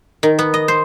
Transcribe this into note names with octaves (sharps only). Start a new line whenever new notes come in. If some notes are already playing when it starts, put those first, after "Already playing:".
D#3
B3
D#5
C5